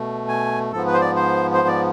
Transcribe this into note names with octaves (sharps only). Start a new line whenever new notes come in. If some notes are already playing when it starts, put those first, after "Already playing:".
Already playing: B2 A3
G#5
G#2 F3 B3 A4
B4
C5
D5
C5
C5
D5